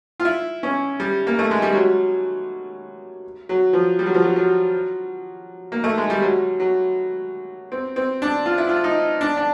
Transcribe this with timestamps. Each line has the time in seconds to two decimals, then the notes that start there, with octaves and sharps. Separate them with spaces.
0.20 F4
0.25 E4
0.63 C#4
1.00 G3
1.27 A#3
1.39 A3
1.51 G#3
1.62 G3
1.75 F#3
3.49 F#3
3.73 F3
3.99 G3
4.06 F#3
4.14 F3
4.22 F#3
4.36 F#3
5.72 A#3
5.84 A3
5.98 G#3
6.10 G3
6.22 F#3
6.60 F#3
7.72 C4
7.96 C4
8.22 D4
8.46 F4
8.58 E4
8.69 F4
8.84 D#4
9.21 D4
9.37 D4